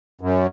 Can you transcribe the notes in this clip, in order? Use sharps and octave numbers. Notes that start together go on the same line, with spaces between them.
F#2